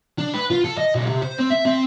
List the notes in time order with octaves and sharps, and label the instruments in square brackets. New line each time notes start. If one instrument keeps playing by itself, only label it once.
[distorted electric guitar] D4
B4
F4
A4
D#5
B1
C3
C5
C4
E5
C4